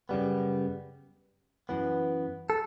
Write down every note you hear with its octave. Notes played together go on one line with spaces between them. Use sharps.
F#2 C#3 G3 B3
F#2 E3 B3
A4